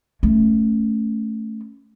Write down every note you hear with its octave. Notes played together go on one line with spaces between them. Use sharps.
A3 C#4